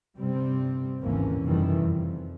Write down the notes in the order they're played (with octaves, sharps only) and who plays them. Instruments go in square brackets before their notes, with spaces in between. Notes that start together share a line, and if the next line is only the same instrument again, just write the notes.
[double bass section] G1 C3 G3 C4
G#1 D#2 D3 E3 A#3 C#4
F1 F#2 D#3 E3 G3 A3
F2